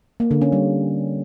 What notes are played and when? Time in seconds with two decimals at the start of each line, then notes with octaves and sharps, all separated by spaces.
0.20 A#3
0.31 D3
0.42 C#4
0.52 G3